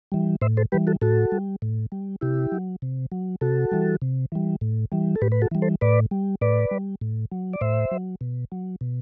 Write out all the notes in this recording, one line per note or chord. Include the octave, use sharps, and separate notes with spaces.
E3 G3
A2 C5 E5
A4 C5
E3 G3 G4 B4
F#4 A4
A2 F#4 A4
G3
A2
G3
C3 E4 G4
F#3
C3
F#3
C3 F#4 A4
E3 G3
C3
E3 G3
A2
E3 G3
A4
A2 G4 B4
B4
F#4 A4
E3 G3
A4 C5
A2 B4 D5
G3
A2 B4 D5
G3
A2
F#3
D5
A2 C5 E5
F#3
B2
F#3
B2